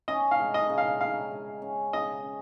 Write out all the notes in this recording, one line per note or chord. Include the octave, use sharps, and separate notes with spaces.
C#4 D#5
F5
G#3
D#5
C#3
F5
C#4 F5
G#3
C#4
C#3 D#5
C#4